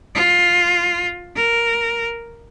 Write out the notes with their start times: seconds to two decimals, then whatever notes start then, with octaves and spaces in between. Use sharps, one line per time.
0.15 F4
1.36 A#4